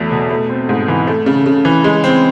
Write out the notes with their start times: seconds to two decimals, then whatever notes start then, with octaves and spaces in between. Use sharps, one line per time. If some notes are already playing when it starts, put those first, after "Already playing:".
Already playing: E2 F#3 A3
0.11 B2
0.30 A3
0.49 C4
0.69 G#2
0.88 E3
1.07 A3
1.26 C#3
1.46 C#3
1.65 E3
1.84 G#3
2.04 C4